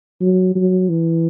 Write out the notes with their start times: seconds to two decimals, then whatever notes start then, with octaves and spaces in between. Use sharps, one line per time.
0.21 F#3
0.56 F#3
0.89 E3